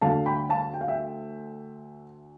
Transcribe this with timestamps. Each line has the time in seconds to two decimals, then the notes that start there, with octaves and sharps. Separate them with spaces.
0.01 D2 D3 A3 F5 A5
0.26 G5 B5
0.49 F5 A5
0.74 G5
0.81 F5
0.88 E5 G5